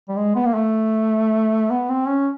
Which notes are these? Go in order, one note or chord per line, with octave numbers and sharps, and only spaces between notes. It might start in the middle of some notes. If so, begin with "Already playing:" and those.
G3
G#3
B3
A#3
A3
B3
C4
C#4